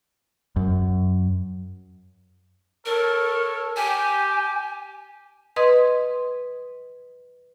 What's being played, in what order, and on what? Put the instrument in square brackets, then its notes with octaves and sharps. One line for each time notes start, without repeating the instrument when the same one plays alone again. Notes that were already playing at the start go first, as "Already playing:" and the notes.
[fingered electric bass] F#2
[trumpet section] A4 C#5 [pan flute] A#4
[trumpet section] G4 [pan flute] G#5
[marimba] B4 D#5 C6 D#6 G#6